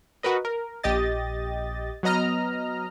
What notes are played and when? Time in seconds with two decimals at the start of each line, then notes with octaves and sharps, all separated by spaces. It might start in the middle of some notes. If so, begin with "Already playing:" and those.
0.23 F#4 A#4 B4 D#5
0.45 A#4
0.83 A#1 G4 D#5 A6
2.03 F#3 B3 D#5 A#5 F6